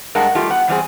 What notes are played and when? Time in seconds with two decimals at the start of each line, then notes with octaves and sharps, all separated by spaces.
0.15 G2 G#3 A#4 F#5 A5
0.35 G3 A3 F4 G4
0.50 B3 F#5
0.68 E2 G3 C4 G#4